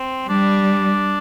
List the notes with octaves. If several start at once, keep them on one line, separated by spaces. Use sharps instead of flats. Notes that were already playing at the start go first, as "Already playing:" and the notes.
Already playing: C4
G3 D4